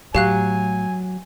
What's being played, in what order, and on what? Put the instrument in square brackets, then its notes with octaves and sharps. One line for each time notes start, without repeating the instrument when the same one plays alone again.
[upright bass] A2 [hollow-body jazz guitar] F#3 [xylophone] G4 F5 F#6 [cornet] G#5